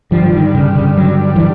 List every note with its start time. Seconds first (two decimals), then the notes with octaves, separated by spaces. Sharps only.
0.11 G2 D3 F3 G3
0.33 D#3
0.55 C#3
0.76 C#3
0.97 F#3
1.36 E3